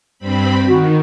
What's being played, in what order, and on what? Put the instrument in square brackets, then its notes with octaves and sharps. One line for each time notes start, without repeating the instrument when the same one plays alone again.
[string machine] G2 C4 B5
[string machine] D#3 [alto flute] F#4